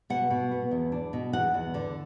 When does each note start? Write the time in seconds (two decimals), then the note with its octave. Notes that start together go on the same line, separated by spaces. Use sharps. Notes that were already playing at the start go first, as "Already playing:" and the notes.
0.10 B2 F#5
0.30 B2
0.51 B3
0.71 E2
0.92 D4
1.13 B2
1.33 E2 F#5
1.54 E2
1.74 D3